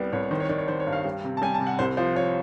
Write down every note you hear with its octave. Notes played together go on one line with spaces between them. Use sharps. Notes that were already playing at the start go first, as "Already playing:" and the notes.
Already playing: C2 G3 B3 D5
C2 C#5
D#3 C5
C#5
D#3 D5
C#5
D#3 C5
C#5
G2
F5
G3
C3
A5
G3 G#5
A5
C3
F#5
C2 C5
F3 C5
F3 C#5